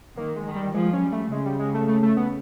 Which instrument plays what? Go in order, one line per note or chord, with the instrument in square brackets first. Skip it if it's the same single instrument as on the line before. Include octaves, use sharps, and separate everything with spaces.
[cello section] D#3 [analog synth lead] A#3
[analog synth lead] G#3
[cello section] D#3
[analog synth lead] G3
[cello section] F3 [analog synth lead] G#3
[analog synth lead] C#4
[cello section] G3
[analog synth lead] A3
[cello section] C#3 [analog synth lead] G#3
[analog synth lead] G3
G#3
A3
A3
A3
B3